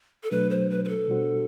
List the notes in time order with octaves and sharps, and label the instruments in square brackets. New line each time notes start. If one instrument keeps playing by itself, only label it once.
[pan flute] A4
[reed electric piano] B2 F#3 A3 D4 [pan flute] B4
[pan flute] C5
B4
B4
A4
[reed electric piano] B2 G3 D4 F#4 C5